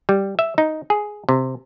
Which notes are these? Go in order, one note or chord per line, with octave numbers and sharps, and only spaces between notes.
G3
E5
D#4
G#4
C3